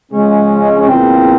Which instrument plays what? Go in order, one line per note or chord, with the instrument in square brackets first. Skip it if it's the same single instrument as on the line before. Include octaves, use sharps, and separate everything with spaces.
[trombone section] C#3 F3 G#3 [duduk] C#4
[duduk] C#4
[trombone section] E2 C#3 E3 A#3 F4 [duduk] C4